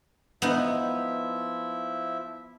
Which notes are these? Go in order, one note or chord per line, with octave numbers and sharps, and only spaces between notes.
F3 B3 D#4 E4 E5